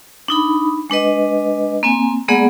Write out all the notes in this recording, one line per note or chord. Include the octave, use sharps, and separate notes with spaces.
D4 D#4 B5
G#3 D4 B4 D#5
A#3 C4 G#5
G#3 A#3 B3 G#4 D5 F#5